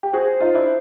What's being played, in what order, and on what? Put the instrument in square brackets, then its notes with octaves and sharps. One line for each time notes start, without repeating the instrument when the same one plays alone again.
[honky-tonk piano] G4
[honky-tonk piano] F#4 G#4 [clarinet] C5
[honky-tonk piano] D#4 F4
D4 E4